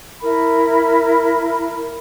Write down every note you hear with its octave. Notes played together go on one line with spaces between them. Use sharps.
E4 A#4 B5